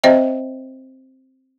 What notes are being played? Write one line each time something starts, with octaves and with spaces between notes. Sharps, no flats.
C4 C5 D#5 E5 G5